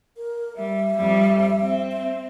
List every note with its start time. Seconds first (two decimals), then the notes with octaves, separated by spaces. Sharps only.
0.17 A#4
0.56 G3 E5
0.97 F2 G3
1.61 C4
1.92 E5